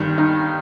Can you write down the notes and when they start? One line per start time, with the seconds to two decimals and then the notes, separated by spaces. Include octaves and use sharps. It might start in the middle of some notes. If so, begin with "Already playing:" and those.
Already playing: G1 G2 D#3
0.18 D#4